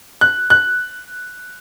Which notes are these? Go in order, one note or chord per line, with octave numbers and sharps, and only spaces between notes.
F#6
F#6